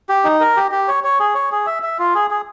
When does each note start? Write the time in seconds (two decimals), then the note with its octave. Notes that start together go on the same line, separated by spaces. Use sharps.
0.09 G4
0.24 D#4
0.40 A#4
0.57 G4
0.71 G4
0.88 C#5
1.04 C#5
1.20 G#4
1.35 C#5
1.52 G#4
1.67 E5
1.83 E5
1.99 F4
2.15 G#4
2.30 G#4